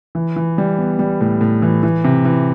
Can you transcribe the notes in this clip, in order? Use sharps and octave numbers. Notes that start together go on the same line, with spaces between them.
E3
E3
G3
B3
G3
A2
A2
E3
E3
C3
E3